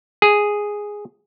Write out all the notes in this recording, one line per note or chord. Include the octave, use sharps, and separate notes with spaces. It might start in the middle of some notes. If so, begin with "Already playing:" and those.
G#4